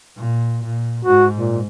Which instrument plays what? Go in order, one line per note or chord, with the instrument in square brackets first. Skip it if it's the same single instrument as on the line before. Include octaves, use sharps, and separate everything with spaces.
[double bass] A#2
A#2
[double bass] G#2 [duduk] F#4
[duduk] A#2